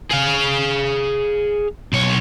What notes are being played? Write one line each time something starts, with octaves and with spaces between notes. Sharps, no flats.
G#4 F5
B1 C#5